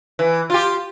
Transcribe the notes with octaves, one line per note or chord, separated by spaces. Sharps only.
E3
F4 G4